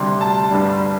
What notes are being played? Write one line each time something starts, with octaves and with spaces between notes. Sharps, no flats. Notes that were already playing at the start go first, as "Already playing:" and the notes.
Already playing: D2 C3 G3 C6
A5
G1 G2 D3 G3